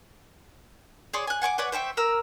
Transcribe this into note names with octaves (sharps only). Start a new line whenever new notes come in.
G#4 C#5 D5 C6
G#5 F#6
F#5 G#5 C#6 D6
B4 C#5 D5 F#5
C5 E5 G5 C#6
A#4 A#5 E6